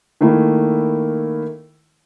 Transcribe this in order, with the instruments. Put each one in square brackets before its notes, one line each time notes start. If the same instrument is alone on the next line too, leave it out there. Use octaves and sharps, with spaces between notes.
[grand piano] D#3 A3 A#3 E4